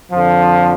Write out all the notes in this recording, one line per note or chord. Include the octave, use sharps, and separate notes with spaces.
F2 D3 F3